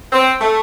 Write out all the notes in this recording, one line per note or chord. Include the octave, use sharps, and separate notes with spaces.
C4
A3